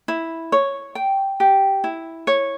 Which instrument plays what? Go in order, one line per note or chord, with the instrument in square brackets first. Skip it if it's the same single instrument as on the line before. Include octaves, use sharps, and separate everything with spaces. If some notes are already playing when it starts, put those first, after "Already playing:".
[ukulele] E4
C#5
G5
G4
E4
C#5